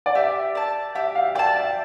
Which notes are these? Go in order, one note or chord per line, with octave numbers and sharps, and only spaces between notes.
D5
G4 E5
D5 A5
G4 E5
F5
D5 G5 A5
E5